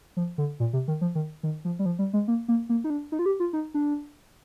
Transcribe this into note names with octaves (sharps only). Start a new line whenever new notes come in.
F3
D3
A#2
C3
D#3
F3
D#3
D#3
F3
G3
F3
G3
G#3
A#3
A#3
A#3
D#4
D4
D#4
F4
G4
F4
D#4
D4